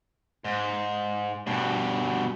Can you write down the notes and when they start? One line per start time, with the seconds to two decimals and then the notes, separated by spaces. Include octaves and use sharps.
0.45 G#2
1.47 G2 B2